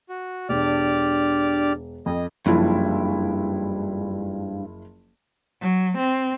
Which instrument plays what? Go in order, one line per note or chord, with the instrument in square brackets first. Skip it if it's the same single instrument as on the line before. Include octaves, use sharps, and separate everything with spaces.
[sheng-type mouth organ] F#4
[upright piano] E1 [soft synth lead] D4 [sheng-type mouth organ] G4 D5 F6
[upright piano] F2 [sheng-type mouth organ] D#5
[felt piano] F#1 F3 E4 [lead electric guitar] G2
[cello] F#3
C4